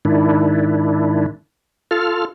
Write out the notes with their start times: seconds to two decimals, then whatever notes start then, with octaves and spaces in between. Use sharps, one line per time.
0.05 G#2 D#3 D4 E4
1.91 F4 A4 F6